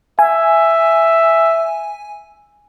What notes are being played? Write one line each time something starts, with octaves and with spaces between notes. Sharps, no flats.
E5 G#5